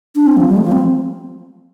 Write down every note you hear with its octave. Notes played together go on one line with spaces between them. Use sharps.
D4
C4
F3
G3
A3
F3
C4